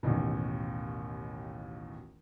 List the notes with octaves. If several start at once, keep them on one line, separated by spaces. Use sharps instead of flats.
A1 D#2 B2